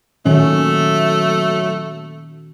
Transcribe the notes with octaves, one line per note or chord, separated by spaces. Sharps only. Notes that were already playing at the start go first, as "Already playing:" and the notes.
A#2 D#3 F#3 A3 C#4